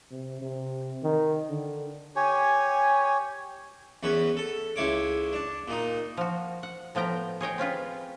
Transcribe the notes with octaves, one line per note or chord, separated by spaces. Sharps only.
C3
C3
D#3
D3
G4 C#5 G#5
E2 C#4 B4
A4
C#2 E4 C#5 D6
D4
A#2 D#4
F3 F#4
F#5
A2 F3 B3 G5 A#5
G#4 C#5 D#5 G5
C4 C#4 F4 B4